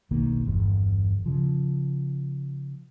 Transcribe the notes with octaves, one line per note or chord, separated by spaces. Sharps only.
E1 B1 D#3 A#3
G1 E2
C#3 F3